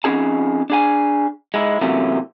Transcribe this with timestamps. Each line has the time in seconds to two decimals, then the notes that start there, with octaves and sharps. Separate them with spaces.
0.04 F2 A3 C#4 D#4 G#4 A5
0.70 D4 G#4 G#5
1.54 G#3 D#4 E4
1.81 C3 E3 F#3 A3 A#3 C#4